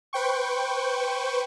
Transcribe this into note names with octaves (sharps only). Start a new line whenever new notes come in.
B4 C5 G5 C#6